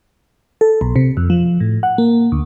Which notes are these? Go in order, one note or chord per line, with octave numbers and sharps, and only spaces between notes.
A4
B1
C3
F2
F3
A2
F#5
A#3
D2